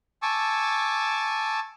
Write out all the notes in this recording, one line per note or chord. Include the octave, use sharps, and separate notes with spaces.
G#5 A5 C#6 D6 E6